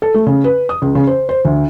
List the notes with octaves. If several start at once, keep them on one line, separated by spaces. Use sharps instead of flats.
A4
A3
C#3
B4
D#6
C#2
C#3
C5
C5
D2